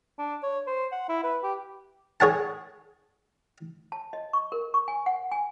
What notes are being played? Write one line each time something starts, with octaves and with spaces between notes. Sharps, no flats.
D4
C#5
C5
F#5
E4
B4
G4
G#4 C#5 F#5 A5
A5
D#5
C#6
A#4
C#6
G#5
F#5
G#5